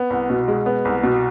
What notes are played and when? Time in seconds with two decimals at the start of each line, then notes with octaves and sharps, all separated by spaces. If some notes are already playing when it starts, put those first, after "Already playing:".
Already playing: B3
0.10 C2
0.30 B2
0.48 G#3
0.66 B3
0.85 C2
1.03 B2